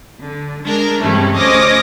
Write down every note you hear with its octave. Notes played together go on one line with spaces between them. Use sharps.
D3
G#3 D4 A#4
G2 C3 E3 G#3 A3 C#4
D2 C#4 C5 D#5 D6 A#6